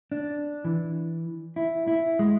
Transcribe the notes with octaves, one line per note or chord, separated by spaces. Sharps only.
D4
E3
E4
E4
G#3